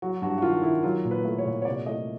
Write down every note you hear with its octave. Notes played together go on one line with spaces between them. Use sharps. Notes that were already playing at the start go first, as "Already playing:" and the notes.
F#3 F#4
G2 F#4
F#4
D#3 F4
D#3 E4
F#3 F4
A#2
B4
A3
C#5
A#2
C#5
C3 D5
A3 D#5